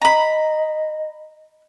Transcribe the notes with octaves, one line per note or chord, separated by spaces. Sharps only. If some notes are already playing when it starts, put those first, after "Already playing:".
D#5 A#5 B5